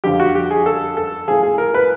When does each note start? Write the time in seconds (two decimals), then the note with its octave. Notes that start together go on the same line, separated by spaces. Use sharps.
0.04 F2 D3 F3 G4
0.20 F#4
0.35 G4
0.51 G#4
0.66 A4
0.97 A4
1.27 A2 F3 G#4
1.43 G#4
1.58 A#4
1.74 B4